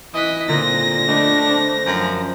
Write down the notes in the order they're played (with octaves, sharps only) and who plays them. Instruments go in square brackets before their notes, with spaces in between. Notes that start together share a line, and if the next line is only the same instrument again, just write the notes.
[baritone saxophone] E3 [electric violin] D#5 B6 [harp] D#6 F#6
[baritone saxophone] A#2 [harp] D3 C4 [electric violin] A#6
[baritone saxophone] A3 [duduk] D4 [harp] D#5 G5 B5
[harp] C5
[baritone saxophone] F#2 [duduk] F3